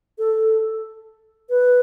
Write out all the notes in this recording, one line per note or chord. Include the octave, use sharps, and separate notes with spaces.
A4
B4